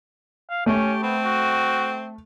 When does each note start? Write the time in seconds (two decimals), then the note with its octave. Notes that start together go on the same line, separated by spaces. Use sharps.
0.50 F5
0.66 A3 C#4 G4
1.02 B3 C4
1.24 F#4